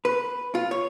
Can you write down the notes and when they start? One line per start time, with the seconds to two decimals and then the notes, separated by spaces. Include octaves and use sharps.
0.05 B4
0.55 F4
0.71 C#5